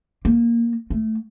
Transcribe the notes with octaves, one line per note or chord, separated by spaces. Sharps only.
A#3
A3